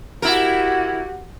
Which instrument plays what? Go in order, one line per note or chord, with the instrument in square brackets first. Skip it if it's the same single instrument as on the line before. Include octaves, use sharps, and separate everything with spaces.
[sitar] E4 A#4 [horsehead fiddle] F#4 G4